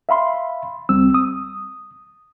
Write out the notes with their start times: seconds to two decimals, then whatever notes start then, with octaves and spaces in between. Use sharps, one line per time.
0.09 E5 F5 B5 C6
0.89 C#2 G3 C4 E6
1.14 D#6